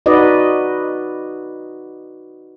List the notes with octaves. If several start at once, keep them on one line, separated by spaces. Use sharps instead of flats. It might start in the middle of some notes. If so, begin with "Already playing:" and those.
D#4 F#4 B4 D5 D#5